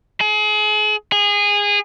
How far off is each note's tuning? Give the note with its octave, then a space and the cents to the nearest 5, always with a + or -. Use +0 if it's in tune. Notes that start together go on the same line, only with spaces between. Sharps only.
G#4 +35
G#4 -20